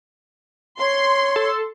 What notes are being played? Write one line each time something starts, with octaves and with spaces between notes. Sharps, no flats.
C#5 C6
A4